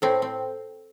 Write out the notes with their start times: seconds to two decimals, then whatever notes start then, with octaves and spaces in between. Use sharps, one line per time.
0.02 A2 C4
0.22 C4